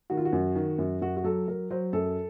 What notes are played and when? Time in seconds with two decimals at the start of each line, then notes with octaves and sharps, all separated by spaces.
0.10 D#3 F#4
0.17 F4
0.25 F#4
0.33 F#2
0.55 D#3
0.78 F#2
1.01 F#2 F#4
1.17 F#4
1.24 F#3 A4
1.48 F#3 A#4
1.71 F#3 C5
1.93 F#2 A4